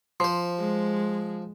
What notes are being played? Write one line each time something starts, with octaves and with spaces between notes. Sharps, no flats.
F3 C5 C6
G#3